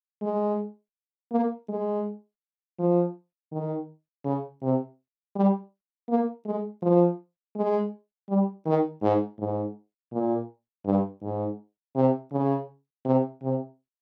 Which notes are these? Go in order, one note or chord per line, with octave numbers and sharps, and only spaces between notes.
G#3
A#3
G#3
F3
D#3
C#3
C3
G3
A#3
G#3
F3
G#3
G3
D#3
G#2
G#2
A#2
G2
G#2
C3
C#3
C3
C3